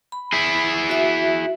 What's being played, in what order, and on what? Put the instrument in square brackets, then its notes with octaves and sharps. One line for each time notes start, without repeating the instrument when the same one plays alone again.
[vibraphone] B5
[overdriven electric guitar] E4 G#4
[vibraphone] F#4 E5